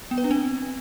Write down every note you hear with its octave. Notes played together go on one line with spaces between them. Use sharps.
B3
B4
D4
C4